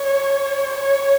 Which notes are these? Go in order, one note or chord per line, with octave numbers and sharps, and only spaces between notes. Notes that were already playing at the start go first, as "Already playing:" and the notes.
Already playing: C#5
C#5